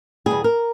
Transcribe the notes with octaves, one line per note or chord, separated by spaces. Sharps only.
E2 B2 G3 G#4
A#4